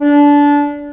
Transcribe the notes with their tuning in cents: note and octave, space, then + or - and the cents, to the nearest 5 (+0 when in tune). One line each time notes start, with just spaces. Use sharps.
D4 -20